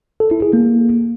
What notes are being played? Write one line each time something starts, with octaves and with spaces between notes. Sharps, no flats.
A4
E4
G#4
A#3